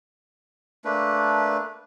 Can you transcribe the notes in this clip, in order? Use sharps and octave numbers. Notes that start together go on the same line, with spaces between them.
A3 A#3 D4 B4